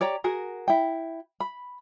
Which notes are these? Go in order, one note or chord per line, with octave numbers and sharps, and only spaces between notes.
G4 C#5 D5 A#5
F#4 G#4 A#4
E4 G5
B5